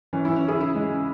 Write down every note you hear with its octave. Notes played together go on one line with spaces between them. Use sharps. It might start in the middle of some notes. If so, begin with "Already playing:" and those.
E3 C#4
E3 E4
C#4
C#3 E4 G#4
C#3 E4
G#3
C#3